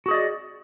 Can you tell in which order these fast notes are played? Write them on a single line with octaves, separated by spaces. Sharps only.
F#4 G#4 D#5 D5